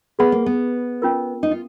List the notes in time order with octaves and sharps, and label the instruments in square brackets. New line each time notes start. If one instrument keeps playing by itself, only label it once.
[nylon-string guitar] B3 [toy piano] G#4 B4 F#5 B5
[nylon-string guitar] A#3
B3
[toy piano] C#4 F4 A#4
[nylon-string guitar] D#4
F4